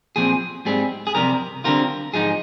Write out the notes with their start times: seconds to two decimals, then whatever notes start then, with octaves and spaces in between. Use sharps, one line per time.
0.16 A#2 F3 C4 G#4
0.65 G#2 G3 C4 G#4
1.07 G#4
1.15 F2 C3 D#3 G3 A#4
1.64 D3 G3 C4 F4 A#4
2.14 G#2 F3 G#3 D#4 G#4